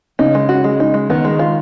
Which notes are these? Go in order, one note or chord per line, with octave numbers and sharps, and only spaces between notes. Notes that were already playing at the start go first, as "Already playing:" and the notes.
C#3 D#4
G#3
F#4
G#3
D#4
G#3
D#3 B3
G#3
F4